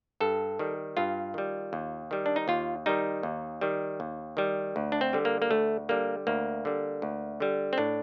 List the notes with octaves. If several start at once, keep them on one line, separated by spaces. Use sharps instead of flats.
G2 A4
D#3 G3
G2 F4
D#3 G3
D#2
D#3 G3
D4
D#4
D#2 F4
D#3 G3 D#4
D#2
D#3 G3
D#2
D#3 G3
D2
D4
C4
D3 G3
A#3
A#3
D2 A3
D3 G3 A#3
D2 A#3
D3 G3
D2
D3 G3
C4
A2 D4